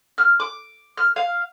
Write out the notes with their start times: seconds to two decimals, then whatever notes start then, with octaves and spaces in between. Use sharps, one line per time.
0.18 F6
0.40 D6
0.98 F6
1.16 F5